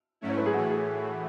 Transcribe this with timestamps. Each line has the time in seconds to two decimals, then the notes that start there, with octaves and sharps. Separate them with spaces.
0.21 G#2 F#3 A3 C#4 E4
0.29 C#5
0.37 B4
0.46 G#4
0.54 A2 E3 A3 F#4
0.71 G#4